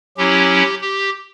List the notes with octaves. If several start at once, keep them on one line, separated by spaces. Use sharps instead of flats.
F#3 C#4 E4 G4
G4